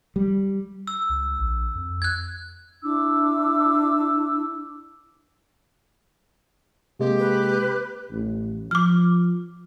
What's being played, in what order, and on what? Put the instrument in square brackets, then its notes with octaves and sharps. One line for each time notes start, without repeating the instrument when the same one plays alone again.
[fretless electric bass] G3
[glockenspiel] E6
[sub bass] C#2
A#1
F2
[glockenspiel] F#6 G#6
[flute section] D4 E4 D6 E6
[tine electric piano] C3 G#3 A#3 [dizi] G4
[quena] B4
[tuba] A1
[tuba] F3 [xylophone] D6 F6